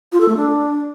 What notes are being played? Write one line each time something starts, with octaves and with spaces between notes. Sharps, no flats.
F4
A4
A3
D4